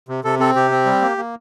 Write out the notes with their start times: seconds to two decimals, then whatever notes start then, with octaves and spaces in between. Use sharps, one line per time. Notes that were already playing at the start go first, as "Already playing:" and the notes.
0.09 C3
0.24 C3 A4
0.39 C4 A4
0.55 C3 G4
0.71 C4
0.86 G3
1.02 A#3
1.17 A#3